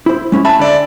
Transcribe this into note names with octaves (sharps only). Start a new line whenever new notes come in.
E4 C5
G#3 C#4 E4
E5 G#5 A5 B5
D3 D5 E5